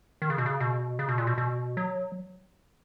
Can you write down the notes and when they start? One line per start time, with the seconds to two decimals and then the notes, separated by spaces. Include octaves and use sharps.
0.22 D#3
0.30 C#3
0.38 B2
0.46 C#3
0.60 B2
0.99 C#3
1.09 B2
1.18 A#2
1.27 B2
1.38 B2
1.77 F#3